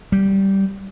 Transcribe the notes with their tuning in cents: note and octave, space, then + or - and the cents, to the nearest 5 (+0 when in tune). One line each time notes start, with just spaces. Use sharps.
G3 -10